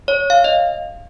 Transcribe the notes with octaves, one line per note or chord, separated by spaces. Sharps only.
C#5
F5
D#5